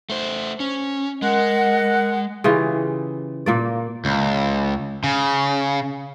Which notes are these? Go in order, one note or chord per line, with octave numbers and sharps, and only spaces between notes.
A3 C5
C#4
G#3 A#4 D#5 F#5
C#3 E3 F4 G4
A#2 A#3 D5
C#2
C#3